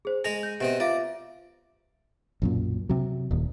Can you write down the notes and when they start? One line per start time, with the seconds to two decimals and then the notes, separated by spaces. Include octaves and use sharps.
0.05 G#4 C5
0.24 G#3 G#4 A#6 F7
0.43 G6
0.60 B2 C4 G4 D#5 E5
0.80 F4 D5 E5 F5
2.42 B1 F#2 A#2
2.89 C3 F#3
3.31 D#1 D#2